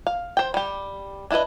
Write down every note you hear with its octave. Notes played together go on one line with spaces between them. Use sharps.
F5
C5 G5
G3 G4
D4 E4 G#4 B4 D#5